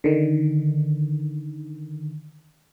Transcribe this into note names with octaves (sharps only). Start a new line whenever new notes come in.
D3 D#3